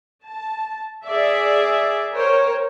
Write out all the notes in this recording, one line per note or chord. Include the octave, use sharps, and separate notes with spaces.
A5
G#4 D5 E5
A#4 C5 C#5 G5